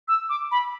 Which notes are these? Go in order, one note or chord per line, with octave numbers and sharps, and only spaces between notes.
E6
D6
B5